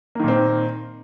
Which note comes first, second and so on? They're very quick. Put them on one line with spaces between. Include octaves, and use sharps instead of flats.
A#3 D#3 A#2 C4